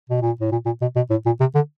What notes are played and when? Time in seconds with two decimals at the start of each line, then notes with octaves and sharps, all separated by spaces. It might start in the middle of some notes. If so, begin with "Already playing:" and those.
0.10 B2
0.22 A#2
0.41 A2
0.52 A#2
0.66 A#2
0.82 B2
0.96 B2
1.10 A2
1.26 A#2
1.40 C3
1.55 D3